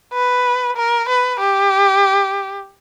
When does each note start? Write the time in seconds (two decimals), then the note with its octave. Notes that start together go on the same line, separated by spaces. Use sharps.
0.14 B4
0.77 A#4
1.09 B4
1.40 G4